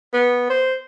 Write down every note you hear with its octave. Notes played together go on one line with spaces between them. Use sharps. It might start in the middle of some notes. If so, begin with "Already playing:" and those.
B3
C5